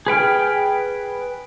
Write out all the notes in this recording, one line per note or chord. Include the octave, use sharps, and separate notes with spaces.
G#4 B4 G5 F6